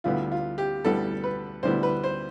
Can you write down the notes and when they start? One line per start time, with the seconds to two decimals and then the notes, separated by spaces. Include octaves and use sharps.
0.04 D2 D3 G3 B3 E4 F4
0.32 F4
0.58 G4
0.85 D2 D3 G3 B3 E4 A4
1.24 B4
1.63 D2 D3 G3 B3 E4 C5
1.83 B4
2.04 C5